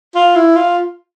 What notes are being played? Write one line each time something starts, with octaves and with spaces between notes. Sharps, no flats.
F4
E4
F4